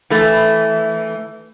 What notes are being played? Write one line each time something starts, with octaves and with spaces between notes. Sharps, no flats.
E3 A3